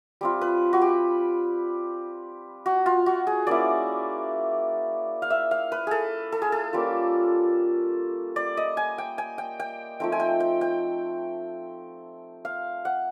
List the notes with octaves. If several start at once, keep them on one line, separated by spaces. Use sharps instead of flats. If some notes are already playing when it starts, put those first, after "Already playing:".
G3 C4 F4
B4
F#4
G4
F#4
F4
F#4
G#4
A#3 C#4 E4 D5
F5
E5
F5
B4
G#4 A4
A4
G#4
A4
G3 A#3 C#4 F4
D5
D#5
G#5
G5
G#5
G5
G5
F3 A3 C4 D#4 G5
G#5
G5
G5
G5
F5
F#5